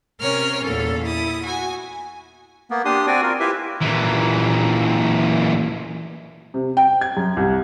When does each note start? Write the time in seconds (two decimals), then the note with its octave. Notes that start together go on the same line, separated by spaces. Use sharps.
0.20 C3 C#4 A#4 C#5 F6
0.62 E2 A#2 A4
1.04 E4 D#6
1.43 F#4 G#5
2.70 A#3 B3
2.85 D4 G4 C6 D#6
3.07 C4 F#4 D5 G#5
3.23 F4 A#4
3.40 E4 F4 G4 B4 E5
3.82 A#2 E3
6.54 C3
6.77 G5
7.01 G#6
7.17 F#2
7.37 C2